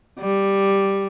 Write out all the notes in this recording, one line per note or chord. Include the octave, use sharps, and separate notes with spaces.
G3